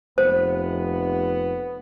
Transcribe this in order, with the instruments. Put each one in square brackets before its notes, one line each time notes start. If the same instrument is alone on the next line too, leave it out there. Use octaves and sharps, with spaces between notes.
[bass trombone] F1 [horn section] B3 [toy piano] C5